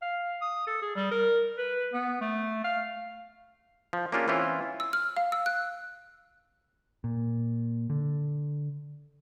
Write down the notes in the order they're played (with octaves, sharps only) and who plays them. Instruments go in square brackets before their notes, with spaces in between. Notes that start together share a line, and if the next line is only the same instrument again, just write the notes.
[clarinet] F5
D#6
A4
G#4
G3
A#4
B4
B3
A3
F5
[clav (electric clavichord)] F3
A#3 C#4 D4 F4 G4 G#4
E3 C4 C#4 E4 F4
[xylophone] E6
F6
F5
E6
F#6
[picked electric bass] A#2
D3